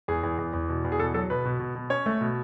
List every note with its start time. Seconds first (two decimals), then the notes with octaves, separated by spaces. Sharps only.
0.08 E2 G#4
0.23 E2
0.39 E2
0.53 E2
0.69 B2
0.84 E2
0.92 G#4
0.99 B2 A4
1.14 F#3 A4
1.30 B2 B4
1.45 B2
1.60 B2
1.75 B2
1.90 C#4 C#5
2.06 A3
2.21 B2